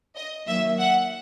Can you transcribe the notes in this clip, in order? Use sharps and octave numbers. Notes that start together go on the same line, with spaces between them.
D#5
D#3 F#3 A#3 E5
F#5